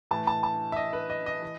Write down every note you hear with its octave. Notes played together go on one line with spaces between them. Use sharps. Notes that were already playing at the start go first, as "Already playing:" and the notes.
A2 E3 A5
A5
A5
E5
D#5
B4
D#5
D#5
E3